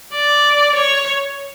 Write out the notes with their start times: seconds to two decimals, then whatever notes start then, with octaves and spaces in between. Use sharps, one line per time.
0.13 D5
0.75 C#5